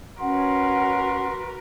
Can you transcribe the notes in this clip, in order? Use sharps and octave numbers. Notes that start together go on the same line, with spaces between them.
C#4 F#4 A#4 B4 F#5 C6